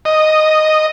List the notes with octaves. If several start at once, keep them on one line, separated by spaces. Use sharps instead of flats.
D#5